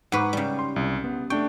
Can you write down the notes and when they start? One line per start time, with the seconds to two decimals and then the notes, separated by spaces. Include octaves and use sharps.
0.12 G#2 B4 F#5 C#6 D6
0.33 C#3 G3
0.59 C6
0.76 C2
1.04 B3
1.30 A3 D4 G5 C#6